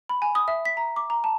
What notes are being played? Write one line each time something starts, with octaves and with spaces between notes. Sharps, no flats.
B5
G#5
D#6
E5
B6
A#5
D6
A#5
A5